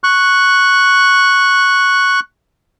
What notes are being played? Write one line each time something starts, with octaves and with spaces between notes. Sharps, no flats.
C#6 F#6